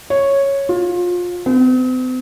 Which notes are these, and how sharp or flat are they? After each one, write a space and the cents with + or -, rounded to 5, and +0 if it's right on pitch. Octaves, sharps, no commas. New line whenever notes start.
C#5 -5
F4 +25
C4 -45